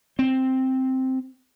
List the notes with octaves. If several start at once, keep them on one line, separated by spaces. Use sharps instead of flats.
C4